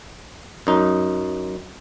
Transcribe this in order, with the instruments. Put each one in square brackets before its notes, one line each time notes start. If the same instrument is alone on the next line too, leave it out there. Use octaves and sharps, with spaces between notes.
[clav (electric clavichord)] F#2 D#4